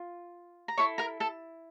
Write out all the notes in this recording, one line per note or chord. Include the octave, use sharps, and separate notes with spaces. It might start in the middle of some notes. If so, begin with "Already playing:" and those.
Already playing: F4
A#5
E4 A4 C#5 C#6
A#4 A#5
A4 A5